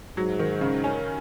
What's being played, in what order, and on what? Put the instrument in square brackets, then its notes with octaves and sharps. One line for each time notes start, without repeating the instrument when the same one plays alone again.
[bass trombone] G#2 [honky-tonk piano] F#3
[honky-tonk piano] D#3
C#3
C#4